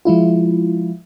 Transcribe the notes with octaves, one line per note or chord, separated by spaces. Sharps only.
F3 G#3 E4 F4